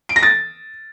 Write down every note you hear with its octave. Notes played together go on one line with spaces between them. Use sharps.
D7
A#6
A6